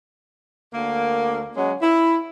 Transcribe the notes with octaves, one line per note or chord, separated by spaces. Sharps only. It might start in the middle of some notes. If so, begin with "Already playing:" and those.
D2 A#3
F#3 G#3 C#4
E4